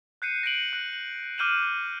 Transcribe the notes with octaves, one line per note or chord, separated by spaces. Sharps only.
F#6 G6 C7 C#7 D#7
A#6 C#7 D7 F#7
F#6
F#7
D6 F6 G6 D#7 E7 F#7